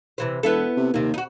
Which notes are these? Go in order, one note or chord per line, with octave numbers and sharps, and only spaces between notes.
C3 E3 C5
E1 B3 E4 A4
C3
D#2 C3 A#3
D#4 F#4